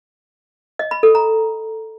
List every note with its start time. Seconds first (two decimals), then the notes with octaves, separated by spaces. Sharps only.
0.79 D#5
0.91 B5
1.03 A4
1.15 A#5